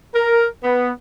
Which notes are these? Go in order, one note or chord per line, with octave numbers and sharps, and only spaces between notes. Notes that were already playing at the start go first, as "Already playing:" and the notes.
A#4
B3